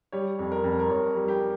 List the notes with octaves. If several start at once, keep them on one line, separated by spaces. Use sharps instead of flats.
G3 C#5
F2
A#4
F2
A#4
F2 C#5
G3
G4